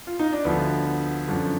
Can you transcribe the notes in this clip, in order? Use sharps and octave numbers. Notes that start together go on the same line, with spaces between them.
F4
D#4
D4
D2 D3 F3 B3
F#2 D3 F3